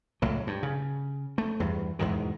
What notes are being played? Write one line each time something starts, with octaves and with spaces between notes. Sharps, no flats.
C#2 A2 F#3
G2
C#3
A3
E2 G2
E2 G#2 B2 D#3